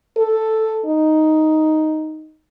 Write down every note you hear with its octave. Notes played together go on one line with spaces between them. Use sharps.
A4
D#4